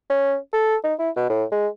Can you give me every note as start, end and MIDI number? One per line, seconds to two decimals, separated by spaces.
0.10 0.36 61
0.53 0.76 69
0.84 0.94 63
0.99 1.10 64
1.16 1.25 47
1.30 1.44 45
1.52 1.68 56